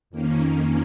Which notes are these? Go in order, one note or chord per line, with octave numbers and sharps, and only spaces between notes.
F2 D#3 A#3 C#4